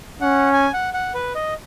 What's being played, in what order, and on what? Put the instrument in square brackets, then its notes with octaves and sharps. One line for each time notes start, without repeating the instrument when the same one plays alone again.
[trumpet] C#4 [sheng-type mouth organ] F#5
[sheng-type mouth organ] G#5
F#5
F#5
B4
D#5